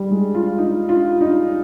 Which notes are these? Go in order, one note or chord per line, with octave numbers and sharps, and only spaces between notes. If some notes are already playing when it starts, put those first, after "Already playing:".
Already playing: G3
G#3
F4
D#4
F4
D#4